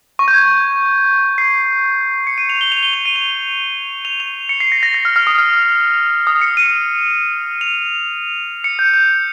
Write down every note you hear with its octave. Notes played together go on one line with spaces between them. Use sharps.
C#6
G6
G#6
C7
C#7
D#7
F7
G7
F7
G7
F7
D#7
F7
F7
F7
C#7
C7
A#6
A#6
A#6
F6
F6
D#6
F6
D#6
C#7
D#7
F7
C#7
G6
G6